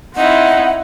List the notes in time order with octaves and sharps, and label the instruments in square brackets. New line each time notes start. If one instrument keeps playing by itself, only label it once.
[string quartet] C4 D#4 E4 [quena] F#5